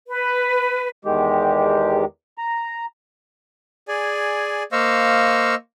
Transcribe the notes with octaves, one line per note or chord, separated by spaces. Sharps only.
B4
E2 D#3 G#3 G4
A#5
G#4 D5 G#5
A#3 C5 D#5 F5 C#6 E6